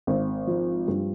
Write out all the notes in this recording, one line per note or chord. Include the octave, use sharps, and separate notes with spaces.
G#1
F3
G2